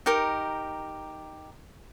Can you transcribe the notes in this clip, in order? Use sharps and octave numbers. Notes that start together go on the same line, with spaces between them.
D#4 G4 A#4